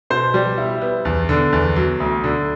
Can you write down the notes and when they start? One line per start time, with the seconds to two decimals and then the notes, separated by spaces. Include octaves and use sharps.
0.10 B2 C5
0.34 G3
0.58 E4
0.81 B3
1.05 E2
1.29 D3
1.53 E2
1.76 F#3
2.00 D2
2.24 D3